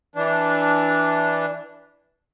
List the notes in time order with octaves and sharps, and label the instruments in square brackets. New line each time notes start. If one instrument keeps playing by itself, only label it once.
[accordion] E3 D4